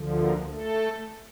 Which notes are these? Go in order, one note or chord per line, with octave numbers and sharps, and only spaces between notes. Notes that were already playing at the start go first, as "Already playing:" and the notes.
Already playing: D2 D3 F3
A#3 A#4
A3 A4